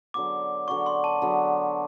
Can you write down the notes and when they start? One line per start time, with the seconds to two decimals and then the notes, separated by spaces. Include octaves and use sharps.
0.14 D3 F#3 B3 D6
0.68 D3 F#3 B3 C#6
0.86 C6
1.04 A5
1.22 D3 F#3 B3